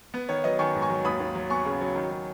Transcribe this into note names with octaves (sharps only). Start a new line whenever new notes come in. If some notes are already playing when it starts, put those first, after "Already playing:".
B3 B4
D#3 C#5
F#3 B4 D#5
D#3 G#5 C#6
G#2
G#5 C#6
F#3
D#2 B5 D#6
D#2
F#3
B3 G#5 C#6
C#3
F#3
D#3
F#3